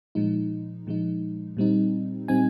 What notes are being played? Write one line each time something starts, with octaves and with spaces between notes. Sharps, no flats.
A#2 F3 G#3 D#4
A#2 F3 G#3 D#4
A#2 G3 C4 D#4
A#2 G3 C4 D#4 G#5